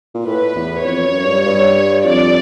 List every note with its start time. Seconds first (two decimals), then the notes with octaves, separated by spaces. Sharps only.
0.14 A#2
0.26 A2 B4
0.56 E2
0.85 F2 C#5
1.06 F#2
1.26 G2
1.46 G2
2.05 F2 D5